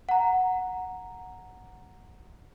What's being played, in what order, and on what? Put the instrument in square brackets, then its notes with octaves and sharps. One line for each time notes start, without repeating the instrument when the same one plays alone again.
[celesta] F#5 A#5